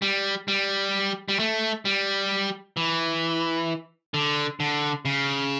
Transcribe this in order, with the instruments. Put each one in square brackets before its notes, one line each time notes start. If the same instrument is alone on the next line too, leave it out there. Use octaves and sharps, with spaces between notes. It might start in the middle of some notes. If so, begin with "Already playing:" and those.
[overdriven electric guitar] G3
G3
G3
A3
G3
E3
D3
D3
C#3